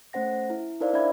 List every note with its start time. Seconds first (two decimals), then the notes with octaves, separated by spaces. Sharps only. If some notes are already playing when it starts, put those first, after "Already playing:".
0.13 A3 C#4 C5 F#5 A#6
0.50 E4
0.81 D#4 E4 A#4 C5 D5 F5
0.93 D4 D5 E5 B5 G#6